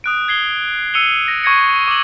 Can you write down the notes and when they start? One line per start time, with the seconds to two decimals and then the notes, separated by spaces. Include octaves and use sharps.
0.04 D#6 F#6 D7
0.28 G#6 C7 G7
0.94 E6 C#7 D#7 F7 G7
1.28 A#6
1.44 C#6 G#6 A#6 C#7
1.88 D6 F#7